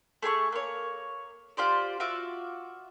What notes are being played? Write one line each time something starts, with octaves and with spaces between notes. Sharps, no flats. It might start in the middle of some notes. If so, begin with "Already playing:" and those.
A3 G#4 G5 C#6
A#3 C#5
F4 G4 C5 D5
F4 F#4 E5 D6